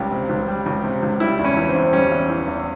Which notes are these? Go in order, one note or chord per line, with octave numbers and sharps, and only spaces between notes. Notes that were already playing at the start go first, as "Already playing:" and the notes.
Already playing: C#2 G3 G4
C3
C#2
G3
C#2
C3
C#2
G3 E4
E2
C#4
E3
C4
E2
G3 C#4
E2
E3
E2